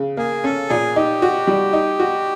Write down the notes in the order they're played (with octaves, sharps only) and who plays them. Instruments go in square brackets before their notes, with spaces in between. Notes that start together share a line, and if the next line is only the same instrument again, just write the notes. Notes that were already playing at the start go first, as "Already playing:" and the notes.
Already playing: [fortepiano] C#3
[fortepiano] A#3 [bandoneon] G#4
[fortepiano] C#4 [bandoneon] A4
[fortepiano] A#2 [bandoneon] G#4
[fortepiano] D#4 [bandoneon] G4
[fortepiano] F#4
G3
D#4
F#4